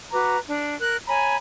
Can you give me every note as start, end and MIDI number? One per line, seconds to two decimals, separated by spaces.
0.12 0.37 66
0.12 0.37 71
0.12 0.37 82
0.12 0.37 86
0.47 0.75 62
0.80 0.97 70
0.80 0.97 90
1.06 1.36 73
1.06 1.36 80
1.06 1.36 82
1.06 1.36 83